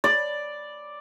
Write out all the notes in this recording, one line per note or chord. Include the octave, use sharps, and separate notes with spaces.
D5